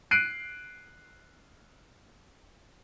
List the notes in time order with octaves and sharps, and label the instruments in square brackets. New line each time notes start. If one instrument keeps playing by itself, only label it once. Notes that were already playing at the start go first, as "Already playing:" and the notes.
[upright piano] F#6 C7 D7 D#7